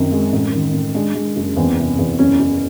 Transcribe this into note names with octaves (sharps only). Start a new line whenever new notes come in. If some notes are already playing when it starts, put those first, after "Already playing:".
Already playing: F#2 D#3 C4
G#3
A1
D#3
A1
G#3 D4
G#3
F#1
E2 C4
C3
E2
F#1 C#4
F#1